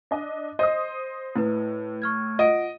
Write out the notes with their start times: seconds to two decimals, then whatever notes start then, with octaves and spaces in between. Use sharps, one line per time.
0.11 D4 D#5
0.59 C5 D#5 D#6
1.36 A2 E4 B4
2.02 C#6 F6 G#6
2.39 F4 D#5 F#5 D7